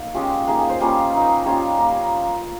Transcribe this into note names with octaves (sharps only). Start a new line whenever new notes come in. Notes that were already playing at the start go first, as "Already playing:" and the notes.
Already playing: A#3 D#4
G#3 C#4 F4 G4
A#3 D#4 G#4
G#4
C5
G3 A#3 C#4 F4
A#3 D#4
G3 A#3 C#4 F4 C#5
A#3 D#4